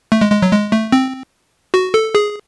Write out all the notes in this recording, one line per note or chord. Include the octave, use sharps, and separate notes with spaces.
A3
G#3
G#3
F#3
G#3
A3
C4
F#4
A4
G#4